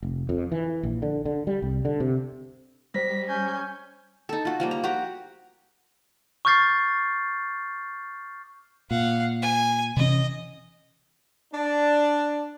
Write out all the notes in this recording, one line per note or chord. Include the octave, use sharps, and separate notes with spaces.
F1
F2
E3
A#1
D3
D3
G3
C2
D3
C3
G3 C5 A#6 B6
C#4 G#5 G6
D#4 A4
F4 F#4
F3 G3 A#3
A#5
F#4 G4 A#5
C#6 D6 F6 G6 A6 C7
A#2 F5 F#5
G#5
C3 E3 C#4 D#5
D4